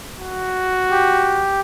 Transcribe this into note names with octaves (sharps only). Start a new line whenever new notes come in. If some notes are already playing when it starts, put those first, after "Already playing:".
F#4
G4